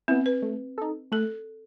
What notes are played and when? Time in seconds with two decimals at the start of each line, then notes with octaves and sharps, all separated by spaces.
0.08 C4 E4
0.11 B3
0.26 B4
0.42 A3
0.78 D#4 A4
1.12 A3 A4